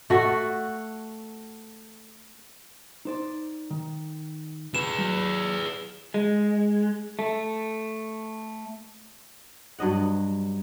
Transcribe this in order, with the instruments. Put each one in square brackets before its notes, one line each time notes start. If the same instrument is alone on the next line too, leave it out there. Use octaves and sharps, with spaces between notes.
[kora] A3 F#4
[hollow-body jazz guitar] D#4 C5 D5
D#3
[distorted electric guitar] G#4 B4 [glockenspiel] E7
[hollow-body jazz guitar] F#3
[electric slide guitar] G#3
A3
[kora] G2 F#3 D#5 F#5